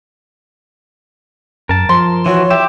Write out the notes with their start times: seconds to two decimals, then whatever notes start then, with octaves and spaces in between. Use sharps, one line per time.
1.69 F#2 A#4 A5
1.89 F3 C6
2.26 E3 F#4 C#5
2.50 G4 E5